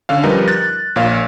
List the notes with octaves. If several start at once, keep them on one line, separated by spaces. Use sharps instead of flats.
D3 C#4 F5
F3 G3 D#4 A#4 B4
F#6 A6
A#1 A#2 C#5 F5